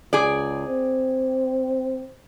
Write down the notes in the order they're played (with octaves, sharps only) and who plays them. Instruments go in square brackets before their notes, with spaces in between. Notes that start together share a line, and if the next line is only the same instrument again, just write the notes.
[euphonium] C#2 [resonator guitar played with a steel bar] G#4 D5
[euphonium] C4